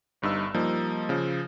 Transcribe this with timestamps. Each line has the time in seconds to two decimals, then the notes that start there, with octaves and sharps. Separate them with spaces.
0.22 G1 G2 D#4 E6
0.54 F3 G3 A#3 D#4
1.09 C#3 F3